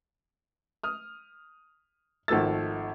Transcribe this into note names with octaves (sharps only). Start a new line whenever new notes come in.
D#6 F6
G#1 D#3 F3 A3 E6 A6